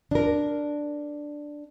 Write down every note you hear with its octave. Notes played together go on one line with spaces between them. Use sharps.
D4 A#4